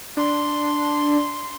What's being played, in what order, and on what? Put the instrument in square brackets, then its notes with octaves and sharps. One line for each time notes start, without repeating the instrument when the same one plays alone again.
[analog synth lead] D4 [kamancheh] C6